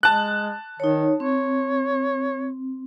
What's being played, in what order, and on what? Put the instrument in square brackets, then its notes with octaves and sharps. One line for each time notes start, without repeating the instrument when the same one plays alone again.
[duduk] G#3 [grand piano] A5 F#6
[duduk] D#3 [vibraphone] D#4 C#5
[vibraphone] C4 [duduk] C#5